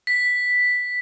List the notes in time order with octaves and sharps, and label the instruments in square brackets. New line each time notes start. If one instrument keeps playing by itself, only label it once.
[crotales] B6